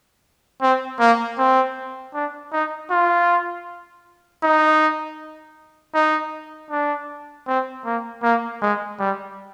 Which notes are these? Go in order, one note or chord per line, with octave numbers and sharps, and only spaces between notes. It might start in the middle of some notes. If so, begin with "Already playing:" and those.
C4
A#3
C4
D4
D#4
F4
D#4
D#4
D4
C4
A#3
A#3
G#3
G3